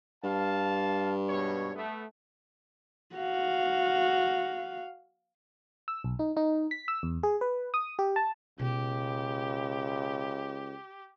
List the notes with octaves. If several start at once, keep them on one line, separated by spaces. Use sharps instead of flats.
G2 F5 A5
G#2 B2 C#5
A3 B3
F#4 F5
E6
B1
D#4
D#4
B6
E6
E2
G#4
B4
D#6
G4
A5
C#2 B2 A#3 G4